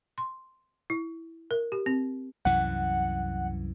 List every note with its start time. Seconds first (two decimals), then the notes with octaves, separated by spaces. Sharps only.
0.18 C6
0.90 E4
1.51 A#4
1.72 G4
1.86 C4
2.45 C2 F#2 E3 F#5